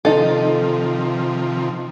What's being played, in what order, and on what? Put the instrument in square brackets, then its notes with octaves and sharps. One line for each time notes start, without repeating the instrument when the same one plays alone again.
[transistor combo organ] C3 D#3 F3 [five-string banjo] D#4 A4